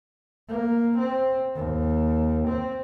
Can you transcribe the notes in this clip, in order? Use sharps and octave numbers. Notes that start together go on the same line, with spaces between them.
A#3
C4
D#2
C4